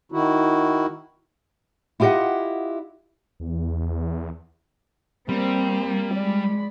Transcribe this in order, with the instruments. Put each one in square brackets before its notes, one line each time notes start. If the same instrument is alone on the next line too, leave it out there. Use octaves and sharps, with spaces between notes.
[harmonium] D#3 E4 F#4
[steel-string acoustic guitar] E4 F4 G4 A#4 D#5 F#5
[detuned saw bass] E2
[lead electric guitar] G3 [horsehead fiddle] A#3 [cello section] C4
[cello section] G#3 [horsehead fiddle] D5 B5